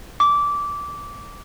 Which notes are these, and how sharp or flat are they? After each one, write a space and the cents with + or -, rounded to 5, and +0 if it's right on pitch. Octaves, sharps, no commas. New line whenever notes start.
D6 -15